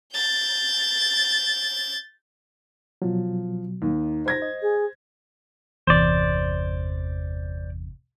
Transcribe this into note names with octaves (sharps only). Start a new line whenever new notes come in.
G6 A6
B2 F3 F#3
D#2 D#4
C5 G#6 A#6
D#5
G#4
G1 E2 C3 C5 D5